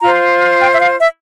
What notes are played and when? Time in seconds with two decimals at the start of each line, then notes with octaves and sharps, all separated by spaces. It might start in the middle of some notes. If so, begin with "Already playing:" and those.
0.01 F4 C5 A#5
0.61 G5
0.72 E5
0.81 F5
1.00 E5